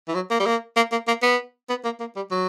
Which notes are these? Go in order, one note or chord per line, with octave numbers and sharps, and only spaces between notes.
E3
F#3
A#3
G3
A#3
A#3
A#3
A#3
B3
B3
A#3
A#3
G3
F#3